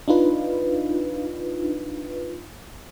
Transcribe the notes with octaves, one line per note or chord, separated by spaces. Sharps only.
D4 D#4 F4 B4